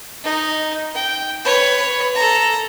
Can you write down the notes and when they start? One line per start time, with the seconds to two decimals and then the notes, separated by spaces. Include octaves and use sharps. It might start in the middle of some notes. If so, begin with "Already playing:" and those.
0.24 D#4
0.95 G5
1.44 B4 C#5
2.15 A4 A#5